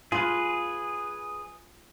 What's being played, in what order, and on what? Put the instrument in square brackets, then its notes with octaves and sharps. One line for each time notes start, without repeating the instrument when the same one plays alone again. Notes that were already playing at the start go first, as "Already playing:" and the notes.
[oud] F4 [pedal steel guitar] G#4 B4